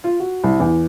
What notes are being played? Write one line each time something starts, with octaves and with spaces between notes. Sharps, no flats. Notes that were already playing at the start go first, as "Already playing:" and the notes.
F4
F#4
C2
E2